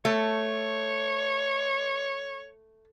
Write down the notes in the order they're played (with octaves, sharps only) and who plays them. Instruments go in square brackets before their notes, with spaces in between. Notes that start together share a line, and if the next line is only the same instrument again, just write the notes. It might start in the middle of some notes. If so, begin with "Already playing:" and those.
[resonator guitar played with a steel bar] A3 [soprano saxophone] C#5